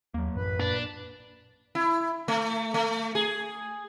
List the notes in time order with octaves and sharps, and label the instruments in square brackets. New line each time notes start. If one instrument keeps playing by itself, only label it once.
[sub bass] D#2 [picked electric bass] F#3 A#3
[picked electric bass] A1 [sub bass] F#2 [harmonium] B4
[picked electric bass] A#2 [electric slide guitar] D4
[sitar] E4
A3
A3
G#4